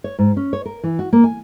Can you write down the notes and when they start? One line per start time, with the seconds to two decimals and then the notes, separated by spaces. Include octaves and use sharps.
0.04 C#5
0.19 G#2
0.37 C#4
0.53 C#5
0.66 A#4
0.84 E3
0.99 F#4
1.13 A#3
1.24 G#5